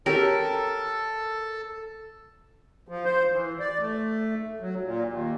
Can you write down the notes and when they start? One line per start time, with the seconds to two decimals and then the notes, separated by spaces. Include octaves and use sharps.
0.06 C#4 G4 A4 A#4 A5
2.88 F3
3.05 C5
3.33 E3
3.60 D5
3.80 A3
4.61 F#3
4.84 A#2
5.09 D#2